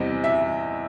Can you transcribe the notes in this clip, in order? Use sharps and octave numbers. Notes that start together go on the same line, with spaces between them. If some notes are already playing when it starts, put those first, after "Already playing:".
Already playing: E2 C3 E3 G3 C4 D#5
E5